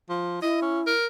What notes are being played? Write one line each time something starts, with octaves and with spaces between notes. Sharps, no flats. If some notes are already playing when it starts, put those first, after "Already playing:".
F3
E4 D#5
C#4
A#4